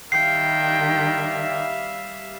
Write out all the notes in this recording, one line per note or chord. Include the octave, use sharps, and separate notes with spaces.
D#3 G3 E5 F5 G5 C7